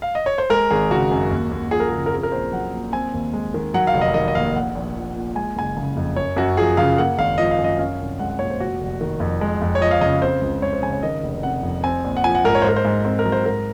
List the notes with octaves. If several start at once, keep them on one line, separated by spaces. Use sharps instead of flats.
F5
D#5
C#5
C5
G#3 A#4
G#1 G#4
C#3 F#4
F#2
D#2
D#2
F3 G#4
A#4
C#3 G#4
A#4
C4 G#4
A#4
A#1 C5
F#3 F#5
A#2
C4 G#5
D#2
G#3
D#3
F#3 F#5
F5
F1
D#5
D#3 D#5
D#5
D#2 F5
A#1 F#5
A#1
F3
A#2
G#3 G#5
F#1 G#5
C#3
F2
F#2 C#5
F#2 F#4
F3 G#4
C#3 F5
A#3 F#5
G#1 F5
F3 D#5
F5
F#2
D#5
C#4 F5
C2
G#3 F#5
F#5
A#2 C#5
C5
F1 F#4
F1
D#3
F2
G#3
F2
C#5
F3 D#5
F5
C#3 D#5
C4 C5
C#2
G#3 C#5
C5
C#3 G#5
C#5
D#3 D#5
F1
C3 F#5
F2
C4 G#5
A#1
F#5
F3 G#5
F#5
G#2 A#4
C#5
C5
G#2 A#4
C5
G#2
C4 C5
A#4
F#3
C5
G#2 A#4